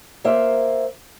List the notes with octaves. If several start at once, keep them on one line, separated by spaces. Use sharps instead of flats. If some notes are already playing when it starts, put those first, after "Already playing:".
A#3 F4 C5 E5